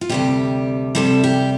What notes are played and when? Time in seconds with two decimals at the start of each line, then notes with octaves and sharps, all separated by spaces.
0.01 F4
0.09 D2 C3 G3 G4
0.95 D2 C3 G3 A4
1.24 G4